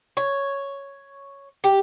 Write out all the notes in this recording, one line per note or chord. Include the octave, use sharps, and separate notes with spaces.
C#5
G4